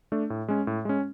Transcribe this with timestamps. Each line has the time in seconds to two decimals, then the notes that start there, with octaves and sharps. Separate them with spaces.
0.12 A3 D4
0.30 A2
0.48 G#3 C#4
0.67 A2
0.85 G#3 C#4